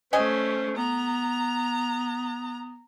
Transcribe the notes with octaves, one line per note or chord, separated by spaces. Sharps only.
A3 C#4 C5 C#5 D#5 G#5
B3 A#5